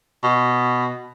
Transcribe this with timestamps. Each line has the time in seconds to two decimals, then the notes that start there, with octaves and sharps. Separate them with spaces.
0.23 B2